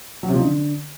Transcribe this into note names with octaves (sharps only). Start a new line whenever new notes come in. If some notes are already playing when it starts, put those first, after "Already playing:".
F#3
C3
F3
D#4
D3